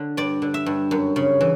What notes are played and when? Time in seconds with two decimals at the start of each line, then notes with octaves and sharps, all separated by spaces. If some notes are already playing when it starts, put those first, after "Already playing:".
Already playing: D3
0.17 G2 D5
0.42 D3
0.54 E5
0.66 G2
0.91 F#2
1.16 C#3
1.41 E3